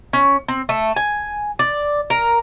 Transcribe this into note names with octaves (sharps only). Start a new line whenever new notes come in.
C#4
C4
A3
G#5
D5
A#4